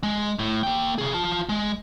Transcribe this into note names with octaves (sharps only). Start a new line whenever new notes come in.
G#3
A2
A#3 G5
C3 G#4
F4 A5
G#3